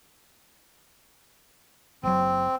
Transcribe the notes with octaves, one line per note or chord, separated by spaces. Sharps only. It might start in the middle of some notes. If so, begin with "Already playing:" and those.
F#1 F#3 C4